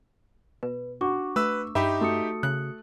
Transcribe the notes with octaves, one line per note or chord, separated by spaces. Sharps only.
B2 B4
D4 F#4 C#6 D6
A3 B4 E6
G2 D#4 G4 E5 B5
A3 F#4 D#6 C#7
C#3 F#6